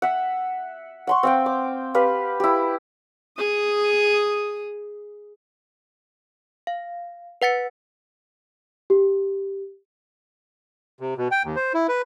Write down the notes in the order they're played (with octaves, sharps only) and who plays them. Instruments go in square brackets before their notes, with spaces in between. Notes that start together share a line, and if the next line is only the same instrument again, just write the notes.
[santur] E5 F#5
F#5 C6 C#6
C4 F5 G5
D6
G4 B4 F5
E4 G4
[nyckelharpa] G#4 D#6
[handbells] F5
B4 F#5 A6 C#7
[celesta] G4
[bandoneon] C3
B2
G5
D#2
C5
E4
B4